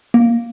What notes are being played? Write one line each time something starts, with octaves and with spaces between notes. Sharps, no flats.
A#3